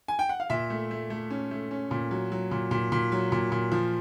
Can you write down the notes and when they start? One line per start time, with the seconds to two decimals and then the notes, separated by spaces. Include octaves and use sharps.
0.08 G#5
0.19 G5
0.29 F#5
0.40 F5
0.50 A#2 E5
0.70 A3
0.91 A3
1.10 A3
1.31 C#4
1.51 A3
1.71 C#4
1.91 A#2
2.11 F#3
2.32 F#3
2.51 A#2
2.71 A#2
2.92 A#2
3.12 F#3
3.32 A#2
3.52 A#2
3.72 F3